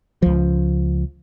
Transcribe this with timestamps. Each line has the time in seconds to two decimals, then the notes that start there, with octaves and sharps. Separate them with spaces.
0.22 C#2 F3